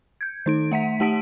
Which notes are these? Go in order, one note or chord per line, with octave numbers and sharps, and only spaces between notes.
G6 G#6
D#3 D#4 D7
A3 E5 F#5 B6
A3 G4 F#5 A5 B6 D7